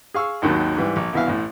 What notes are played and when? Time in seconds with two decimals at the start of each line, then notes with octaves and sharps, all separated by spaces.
0.14 G#4 F5 C#6 E6
0.42 G#1 D#2 D#3 F#3
0.77 G#2 E3 G3
0.96 A#1
1.13 C2 B2 E3 E5 F5
1.27 A1 A2